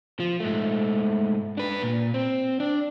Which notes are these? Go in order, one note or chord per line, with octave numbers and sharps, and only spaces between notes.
F3
G#2 A3
D4 B4
A#2
C4
D4